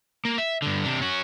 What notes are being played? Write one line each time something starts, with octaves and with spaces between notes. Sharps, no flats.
A#3
E5
G2 D3
C3 D4
C#4 F#4